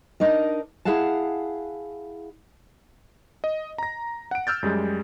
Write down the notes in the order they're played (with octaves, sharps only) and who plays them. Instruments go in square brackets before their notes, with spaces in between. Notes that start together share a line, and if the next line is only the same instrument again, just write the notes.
[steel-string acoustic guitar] D4 D#4 A#4 D#5
E4 G#4 F5 F#5 A5
[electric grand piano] D#5
A#5 A#6
F#5 D7
E6 F6 G6 A6
F#2 G3 G#3